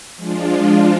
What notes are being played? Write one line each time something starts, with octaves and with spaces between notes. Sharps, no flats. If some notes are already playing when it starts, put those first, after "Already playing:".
F3 G#3 D4 F4